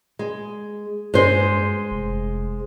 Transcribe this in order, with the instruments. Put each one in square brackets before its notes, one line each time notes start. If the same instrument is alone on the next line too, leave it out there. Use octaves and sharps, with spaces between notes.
[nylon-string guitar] G#3
[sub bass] G2 [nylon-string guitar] G#3 C5
[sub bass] F1